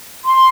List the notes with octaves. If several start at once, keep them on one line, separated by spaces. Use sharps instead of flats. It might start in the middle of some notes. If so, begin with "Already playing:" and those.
C6